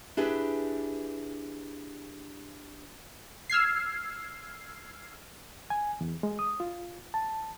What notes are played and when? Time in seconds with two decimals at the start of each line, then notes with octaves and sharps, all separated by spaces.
0.17 D4 E4 G4 G#4 B4
3.50 E6 F6 G#6 C7
5.70 G#5
6.01 E2
6.23 G#3
6.39 D#6
6.60 F4
7.14 A5